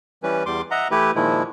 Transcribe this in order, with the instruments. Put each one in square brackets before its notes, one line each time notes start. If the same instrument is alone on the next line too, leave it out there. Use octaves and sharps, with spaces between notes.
[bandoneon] E3 G3 C#4 B4
E2 G3 C6 D6
D#5 E5 F#5 A#5
E3 A3 E4 G4 B4
A#2 D#3 F3 G#3 E4